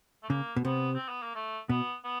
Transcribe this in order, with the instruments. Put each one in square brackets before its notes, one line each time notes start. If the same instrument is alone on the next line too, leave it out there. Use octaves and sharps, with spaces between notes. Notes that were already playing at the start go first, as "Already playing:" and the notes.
[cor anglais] A3
[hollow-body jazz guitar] C#3 [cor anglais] A#3
[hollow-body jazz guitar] B2
[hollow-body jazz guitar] C3 [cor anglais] B3
[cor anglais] C4
B3
A#3
A3
[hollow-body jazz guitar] B2 [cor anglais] B3
[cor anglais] B3